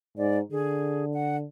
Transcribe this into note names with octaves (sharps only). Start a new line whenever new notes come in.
G#2 D5
D3 G#4
F#5